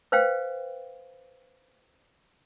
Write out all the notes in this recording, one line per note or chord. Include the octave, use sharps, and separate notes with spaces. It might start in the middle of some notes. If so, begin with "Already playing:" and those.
B4 C5 F5 G5